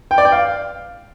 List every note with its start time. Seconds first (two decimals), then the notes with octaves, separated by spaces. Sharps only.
0.11 G5
0.18 D5
0.25 G5
0.32 F5